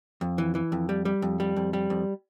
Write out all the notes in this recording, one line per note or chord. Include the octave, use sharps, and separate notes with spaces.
F2
E3
E3
F2
G3
G3
F2
G3
F2
G3
F2